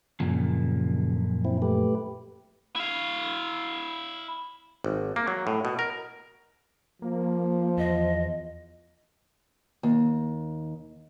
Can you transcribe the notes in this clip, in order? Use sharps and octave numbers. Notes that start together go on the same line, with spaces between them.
F#2 A#2 C#3 F3
C4 E4
A3 G4 B4
E4 F5
G#1
A#3
F#3
A2
B2
A#4
F3 A#3
E2 D#5
D#2